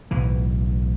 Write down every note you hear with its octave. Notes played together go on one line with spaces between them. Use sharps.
B1 A2 E3